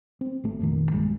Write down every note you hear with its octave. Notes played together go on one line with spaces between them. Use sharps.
C4
G#1 A3
F1 A#1 D#3
B1 G2 F#3 G#3